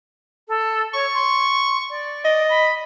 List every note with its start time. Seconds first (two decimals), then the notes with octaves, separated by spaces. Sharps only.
0.48 A4
0.94 C#5 C#6
1.14 C6
1.90 D5
2.25 D#5
2.49 B5